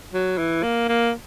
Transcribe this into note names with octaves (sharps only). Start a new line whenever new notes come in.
F#3
E3
A#3
A#3